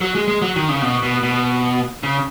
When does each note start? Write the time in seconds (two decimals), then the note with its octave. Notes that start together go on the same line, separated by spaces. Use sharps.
0.01 F#3
0.15 G#3
0.28 G#3
0.42 F#3
0.56 D#3
0.69 C#3
0.82 B2
1.03 B2
1.23 B2
2.03 C#3